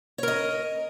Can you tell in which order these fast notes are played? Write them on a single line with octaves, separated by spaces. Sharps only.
C#5 A#4 D#5